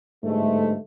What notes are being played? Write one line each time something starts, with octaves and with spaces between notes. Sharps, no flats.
G1 G#2 G#3 A3